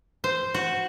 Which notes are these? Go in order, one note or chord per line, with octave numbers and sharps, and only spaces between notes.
C5
F#4